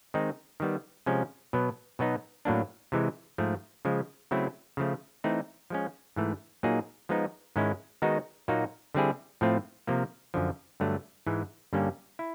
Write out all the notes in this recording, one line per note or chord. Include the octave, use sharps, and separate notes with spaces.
D#3 G#3 C4 D#4
D#3 G3 B3
C3 F3 G#3 C#4
B2 F#3 B3
B2 F#3 B3 D#4
A2 F#3 A#3 D4
C3 E3 G#3
G#2 F3 A3
C#3 F3 G#3
C#3 F#3 A3 C4 E4
C#3 F3 A3
E3 A3 C4 D#4
F3 G#3 C#4
G#2 E3 A3
A#2 F#3 A#3 D#4 G#4
F3 G#3 B3 D#4
G#2 D#3 G#3 C#4 E4
D#3 G#3 B3 D#4 F#4
A#2 F#3 A#3 D#4 F#4
D3 G3 C4 E4 G#4
A2 F3 A3 C4 F4
C3 F3 A#3
F#2 D3 F3
G2 D3 F#3 A3
G#2 E3 G#3
G2 D3 G3 A#3 C#4
E4